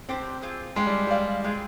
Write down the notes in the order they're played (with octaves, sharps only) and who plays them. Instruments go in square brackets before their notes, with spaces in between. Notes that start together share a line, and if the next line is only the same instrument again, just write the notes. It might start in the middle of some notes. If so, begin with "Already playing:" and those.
[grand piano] C4 [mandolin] D4 G4 C5
[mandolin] C4 F4 G#4
[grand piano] G#3 [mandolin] D4 G4 C5 F5
[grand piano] G3
[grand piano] G3 [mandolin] G4 D5 F5
[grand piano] G#3 [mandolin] C4 F4 G#4